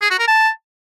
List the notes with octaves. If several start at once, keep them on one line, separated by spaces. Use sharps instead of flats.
G#4
F#4
A#4
A5